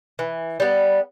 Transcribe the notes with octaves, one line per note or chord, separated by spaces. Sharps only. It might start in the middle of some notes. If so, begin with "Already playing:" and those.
E3
G3 B3